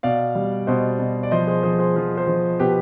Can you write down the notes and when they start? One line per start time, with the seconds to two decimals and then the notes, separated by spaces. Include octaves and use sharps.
0.03 B2 D5 F5
0.35 G3
0.67 B2 C5 D#5
0.99 B2
1.23 D5
1.31 F3 C5 D#5
1.47 G#4 C5
1.63 F3 G#4 C5
1.79 G#4 C5
1.96 F3
2.17 G#4 C5
2.27 F3
2.60 B2 G4 B4